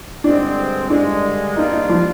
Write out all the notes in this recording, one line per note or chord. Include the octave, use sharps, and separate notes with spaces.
G2 D3 G#3 C4 D4
G2 D3 G#3 D4
G#2 G3 A#3 D4 D#4 F4
D#4
F3